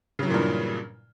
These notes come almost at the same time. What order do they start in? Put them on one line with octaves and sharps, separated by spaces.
C#3 F#3 E3 A#2 G2